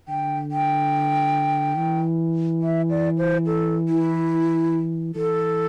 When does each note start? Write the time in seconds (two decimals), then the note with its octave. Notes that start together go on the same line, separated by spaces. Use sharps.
0.08 D3 G5
0.51 G5
1.77 E3
2.62 E5
2.90 D5
3.18 C5
3.46 A4
3.89 E4
5.15 E3 A4